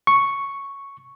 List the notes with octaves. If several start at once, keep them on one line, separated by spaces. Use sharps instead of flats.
C#6